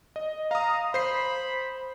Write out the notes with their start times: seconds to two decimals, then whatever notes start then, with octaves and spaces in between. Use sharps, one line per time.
0.16 D#5
0.51 F5 A#5 D#6
0.94 C5 B5 C7